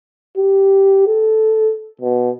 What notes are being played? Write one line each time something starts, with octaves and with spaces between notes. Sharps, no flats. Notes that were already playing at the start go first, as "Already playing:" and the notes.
G4
A4
B2